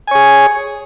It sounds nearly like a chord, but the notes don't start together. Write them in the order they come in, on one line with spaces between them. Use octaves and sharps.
G#5 C#5 G#4